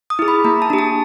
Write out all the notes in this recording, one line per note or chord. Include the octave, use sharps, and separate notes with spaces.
D#6
E4 G#4
B5
A#3 A#5
A5
D4 G4
A5